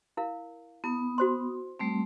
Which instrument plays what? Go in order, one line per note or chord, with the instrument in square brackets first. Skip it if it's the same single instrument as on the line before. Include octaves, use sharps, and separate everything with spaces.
[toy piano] E4 A#4 F5
[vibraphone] B3 D#6 [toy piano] E4
[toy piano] F#4 C5 C6
[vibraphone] G3 A3 C4